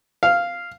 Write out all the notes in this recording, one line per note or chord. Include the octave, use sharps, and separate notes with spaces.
F5